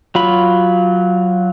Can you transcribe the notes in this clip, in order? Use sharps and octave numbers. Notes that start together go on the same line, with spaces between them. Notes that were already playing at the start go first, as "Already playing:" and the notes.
F#3 F4 B5